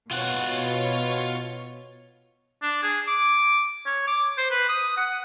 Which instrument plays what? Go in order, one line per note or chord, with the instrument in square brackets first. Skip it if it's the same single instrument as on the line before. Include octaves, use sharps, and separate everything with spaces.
[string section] B2 C#5 [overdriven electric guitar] F4 F#5
[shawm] D4
G#4
D6
C#5
D6
C5
B4
D#6
F#5